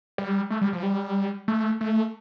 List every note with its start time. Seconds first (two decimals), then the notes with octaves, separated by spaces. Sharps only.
0.18 G3
0.50 A3
0.61 G3
0.73 F3
0.83 G3
1.48 A3
1.81 A3